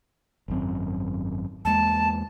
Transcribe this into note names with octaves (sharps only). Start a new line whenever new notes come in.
G#1 F#2 C4
E2 G#3 A#3 A5